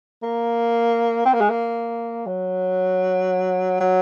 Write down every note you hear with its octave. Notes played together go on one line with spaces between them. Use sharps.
A#3
C4
A#3
G#3
A#3
F#3
F#3